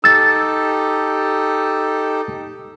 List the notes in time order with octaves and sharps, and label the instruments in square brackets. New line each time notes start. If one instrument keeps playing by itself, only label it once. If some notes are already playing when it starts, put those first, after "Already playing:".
[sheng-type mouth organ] D#4 G4 A4 [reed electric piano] E6 A6